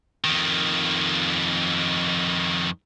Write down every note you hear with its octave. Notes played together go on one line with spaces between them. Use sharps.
F2 D#3